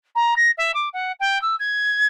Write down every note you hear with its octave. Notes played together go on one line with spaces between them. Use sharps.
A#5
A#6
E5
D6
F#5
G5
E6
G#6